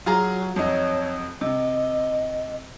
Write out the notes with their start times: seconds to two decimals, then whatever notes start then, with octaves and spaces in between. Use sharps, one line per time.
0.06 F#3 F4 G#4 A#5
0.56 F2 F#3 D#4 C#5
1.41 C3 D#5